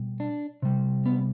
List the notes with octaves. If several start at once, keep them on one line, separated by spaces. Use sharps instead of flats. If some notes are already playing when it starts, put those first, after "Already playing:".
Already playing: B2 G3
D4
C3 G3
B3